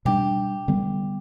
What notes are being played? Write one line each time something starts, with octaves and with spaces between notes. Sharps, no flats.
B2 G3 D4 G4
D3 G3 B3